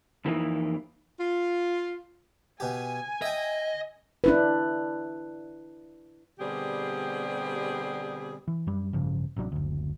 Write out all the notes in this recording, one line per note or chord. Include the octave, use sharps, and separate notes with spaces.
F2 E3 A#3 B3 D#4 E4
F4
B2 G4 G#5
D#5 E5 G5
D4 E4 B4
B2 D3 G3 C4 G4 G#4
E3
F#2 G3
A1 G2 C#3 F3
A1 C3 F#3 D4
F#1 D2